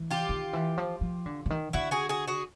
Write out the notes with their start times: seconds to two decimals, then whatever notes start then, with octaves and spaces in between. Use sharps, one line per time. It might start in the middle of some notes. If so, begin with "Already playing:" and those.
Already playing: E3
0.10 F4 G4
0.29 D#3
0.53 E3
0.77 F3
1.01 F3
1.26 D3
1.46 D3
1.50 D#3
1.73 D3 E4 F#4
1.91 F#4 G#4
2.09 F#4 G#4
2.28 F#4 G#4